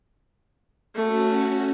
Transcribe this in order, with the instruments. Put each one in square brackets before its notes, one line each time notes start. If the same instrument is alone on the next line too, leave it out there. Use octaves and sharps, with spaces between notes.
[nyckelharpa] A3 [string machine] C#4 F#4